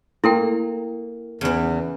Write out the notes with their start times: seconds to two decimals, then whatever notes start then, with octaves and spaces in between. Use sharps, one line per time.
0.24 A#3 E4 A4 G5
1.41 E2 C#3 E3